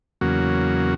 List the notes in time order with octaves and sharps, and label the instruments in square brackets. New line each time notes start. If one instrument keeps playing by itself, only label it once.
[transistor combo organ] E2 C#3 F#3 A#3 F#4